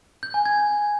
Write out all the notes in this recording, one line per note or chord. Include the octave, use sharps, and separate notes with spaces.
G6
G#5
G#6